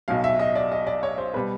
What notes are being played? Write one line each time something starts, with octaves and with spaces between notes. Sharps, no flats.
B1 B2 F#3 F5
E5
D#5
D5
D#5
D5
C#5
C5
B2 G3 B4